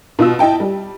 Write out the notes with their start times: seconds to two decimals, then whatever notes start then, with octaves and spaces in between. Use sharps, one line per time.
0.19 B2 F4 E6
0.39 E4 D#5 G5 A5
0.60 G3